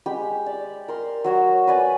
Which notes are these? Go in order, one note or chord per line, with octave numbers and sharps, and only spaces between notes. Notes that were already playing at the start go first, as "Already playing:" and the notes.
G#3 G4 B5
D5
A#4 C6
F#3 F#4 C#5
B4 D5 G#5